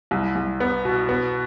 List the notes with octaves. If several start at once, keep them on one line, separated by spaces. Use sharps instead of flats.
C2
C2
B3
B2
B3